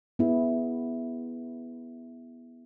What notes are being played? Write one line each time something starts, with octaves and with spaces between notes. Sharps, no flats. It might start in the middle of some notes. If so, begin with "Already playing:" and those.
B3 E4 G#4